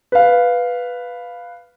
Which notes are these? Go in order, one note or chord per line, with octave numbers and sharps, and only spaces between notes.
B4 F5